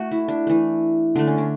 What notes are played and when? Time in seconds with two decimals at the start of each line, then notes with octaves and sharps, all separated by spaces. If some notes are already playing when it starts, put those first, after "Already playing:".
Already playing: A3 F#4 A4
0.11 E4
0.28 D4
0.47 E3 A3
1.15 D3 A3 D4
1.27 C#4
1.38 D4